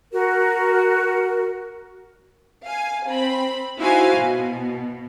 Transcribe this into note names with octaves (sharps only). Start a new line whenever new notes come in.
F#4 A#4
F5 G#5
C4 B5
D#4 E4 F#4 C5 F5 G#5
B2